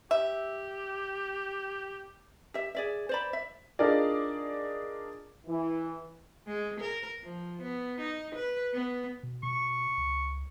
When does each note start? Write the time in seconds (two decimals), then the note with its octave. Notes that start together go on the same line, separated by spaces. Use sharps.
0.11 G4 E5
2.54 G4 E5
2.75 G#4 D5 E5
3.09 C5 D5 B5
3.33 E5
3.79 D4 D#4 F4 G#4 A#4 D5
5.47 E3
6.47 G#3
6.80 A#4
7.23 F3
7.62 B3
8.00 D#4
8.35 B4
8.74 B3
9.23 B2
9.43 B2 C#6
9.97 C#2